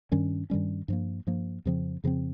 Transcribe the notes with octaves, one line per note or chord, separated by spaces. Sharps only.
G2 D#3 G3 C#4
G2 D#3 G3 C#4
G2 F3 A#3
G2 F3 A#3
F2 C#3 F3 C4
F2 C#3 F3 C4